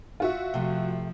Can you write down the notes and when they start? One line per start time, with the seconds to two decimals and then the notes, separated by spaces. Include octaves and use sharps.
0.20 F4 F#4 E5
0.54 C3 F3 A3